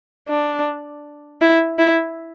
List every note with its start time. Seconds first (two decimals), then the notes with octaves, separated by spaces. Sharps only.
0.29 D4
1.41 E4
1.79 E4